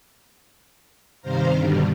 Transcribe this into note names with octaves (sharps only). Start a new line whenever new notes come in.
G2 C3 D#3 C5 F5 A#5
G2 B2 D3 D#3 G3